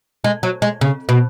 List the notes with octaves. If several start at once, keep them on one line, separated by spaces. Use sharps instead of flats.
G#3
F#3
G#3
C#3
B2